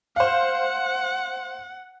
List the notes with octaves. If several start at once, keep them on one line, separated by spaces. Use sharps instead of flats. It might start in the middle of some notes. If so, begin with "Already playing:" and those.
C5 F5 F#5